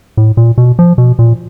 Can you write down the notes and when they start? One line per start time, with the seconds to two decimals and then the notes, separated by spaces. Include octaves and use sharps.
0.17 A2
0.37 A#2
0.58 B2
0.79 F3
0.98 B2
1.19 A#2